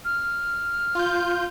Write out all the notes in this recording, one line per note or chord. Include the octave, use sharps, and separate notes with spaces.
F6
F4 G6